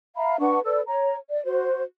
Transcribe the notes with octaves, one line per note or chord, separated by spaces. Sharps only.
E5 F5 A#5 B5
D4 B4 F#5 C#6
A4 B4 D5 E6
C#5 A#5
D5
F#4 C5